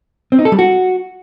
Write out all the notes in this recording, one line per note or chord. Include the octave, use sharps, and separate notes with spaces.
C4
D#4
A4
G3
F#4